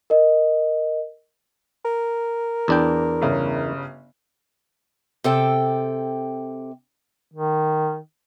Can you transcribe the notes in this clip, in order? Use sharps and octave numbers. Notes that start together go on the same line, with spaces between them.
A#4 D#5
A#4
E2 D4 G5
G1 C#3
C3 A4 G5
D#3